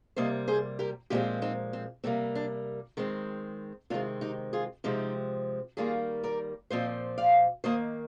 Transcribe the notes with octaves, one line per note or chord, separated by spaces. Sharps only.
C3 G3 A#3 C5 D#5
G#4 C5
G4 A#4
A#2 F3 G#3 C4 D#4 G4
C4 D#4
C4
C3 G3 A#3 C4
D4
D#3 G#3 C4
C3 D#3 G#3 C4 D4 F4
D#4 G4
F4 G#4
C3 F3 G#3 C4 D#4 G4
D#3 G3 A#3 F4 G#4
A#4 D5
A#2 F3 C4 C5 D#5
D5 F5
D#3 A#3 C5 D#5